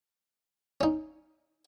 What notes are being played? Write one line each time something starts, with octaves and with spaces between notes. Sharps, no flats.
C#4 D#4